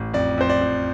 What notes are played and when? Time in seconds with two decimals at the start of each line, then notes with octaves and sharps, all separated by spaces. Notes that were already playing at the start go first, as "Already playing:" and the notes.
Already playing: A1
0.13 F2 D5
0.38 F2 C5
0.50 D5
0.61 F2